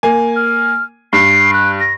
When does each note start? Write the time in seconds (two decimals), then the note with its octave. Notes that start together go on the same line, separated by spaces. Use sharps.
0.03 A#3 G#5
0.36 F6
1.13 G2 C7
1.53 F#6
1.80 A#6